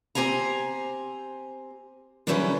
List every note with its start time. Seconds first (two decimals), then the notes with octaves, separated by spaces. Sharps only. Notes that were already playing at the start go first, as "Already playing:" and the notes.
0.15 C4 G4 C5 G#5 A#5
2.27 D3 E3 F#3 G3 C#4 B4